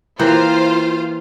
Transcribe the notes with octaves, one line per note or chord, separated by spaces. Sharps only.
E3 A#3 F4 G4 C5 F5